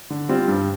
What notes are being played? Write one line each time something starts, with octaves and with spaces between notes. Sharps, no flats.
D3
G3 C4 F4
G2